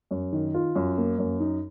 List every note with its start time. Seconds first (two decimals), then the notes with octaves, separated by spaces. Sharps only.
0.11 F#2
0.33 D#3
0.54 F4
0.75 F#2
0.98 A#3
1.19 F#2
1.40 D#4